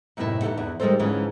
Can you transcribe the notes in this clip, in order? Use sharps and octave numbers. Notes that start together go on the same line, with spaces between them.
F#2 A2 C3 D#4 E4 A5
G#2 E3 A3 A#3 A4 F#5
E2 E3 D4
D#3 G3 G#3 D#4 A4 C5
G#2 D3 E3 F3 G#3 C#4